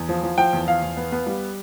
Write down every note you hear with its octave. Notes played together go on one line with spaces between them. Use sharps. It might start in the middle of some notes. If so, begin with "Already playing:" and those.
Already playing: E2
F3
F3
F3 G5
E2
F3 F5
E2
B3
B3
G3